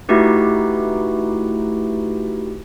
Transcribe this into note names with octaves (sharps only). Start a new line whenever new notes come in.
A3 D#4 E4 F#4 G4 B4